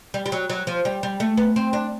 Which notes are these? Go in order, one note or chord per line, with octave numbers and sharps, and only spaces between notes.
G3
G3
F#3
F#3
F3
G3
G3
A3
B3
C4
D4